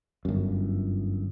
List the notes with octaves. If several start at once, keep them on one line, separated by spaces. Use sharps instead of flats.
G1 F#2